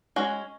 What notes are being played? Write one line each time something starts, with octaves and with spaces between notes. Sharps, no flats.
G#3 C#4 F#4